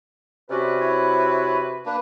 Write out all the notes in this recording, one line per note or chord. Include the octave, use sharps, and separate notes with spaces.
C3 C#4 F#4 B4 D5
E4 C#5
A#3 D4 B4